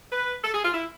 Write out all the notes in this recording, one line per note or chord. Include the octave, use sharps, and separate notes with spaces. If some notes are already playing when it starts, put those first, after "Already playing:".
B4
A4
G#4
F4
E4